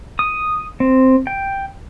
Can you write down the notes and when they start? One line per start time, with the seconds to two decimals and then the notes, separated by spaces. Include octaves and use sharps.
0.19 D#6
0.80 C4
1.27 G5